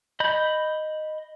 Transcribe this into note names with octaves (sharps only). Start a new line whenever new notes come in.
D#5 B5 G6